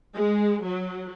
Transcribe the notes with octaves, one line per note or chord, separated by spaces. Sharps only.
G#3
F#3